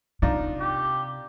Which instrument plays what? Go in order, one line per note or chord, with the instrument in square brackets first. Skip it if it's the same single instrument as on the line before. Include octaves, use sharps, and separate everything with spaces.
[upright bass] C3 [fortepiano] D4 D#4 F4
[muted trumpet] G4